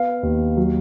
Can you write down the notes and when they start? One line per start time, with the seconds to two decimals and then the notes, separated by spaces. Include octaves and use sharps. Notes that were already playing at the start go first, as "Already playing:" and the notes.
Already playing: B3 F5
0.23 D#2
0.57 F#3